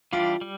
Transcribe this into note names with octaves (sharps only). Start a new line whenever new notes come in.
E3 G3 D4 F4 G4
G3